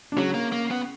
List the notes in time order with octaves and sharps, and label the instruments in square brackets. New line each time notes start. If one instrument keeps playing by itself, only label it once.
[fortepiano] D4
[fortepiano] C#3 C#4 [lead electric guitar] F#3
[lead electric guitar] A#3
A#3
B3